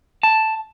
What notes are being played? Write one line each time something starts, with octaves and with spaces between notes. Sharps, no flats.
A5